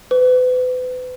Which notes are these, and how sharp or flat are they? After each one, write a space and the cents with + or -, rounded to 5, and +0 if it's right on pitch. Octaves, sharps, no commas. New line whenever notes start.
B4 +35